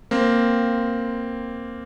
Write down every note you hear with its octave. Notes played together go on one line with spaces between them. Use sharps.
A#3 C4